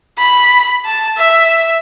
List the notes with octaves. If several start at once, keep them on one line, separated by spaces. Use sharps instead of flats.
B5
A5
E5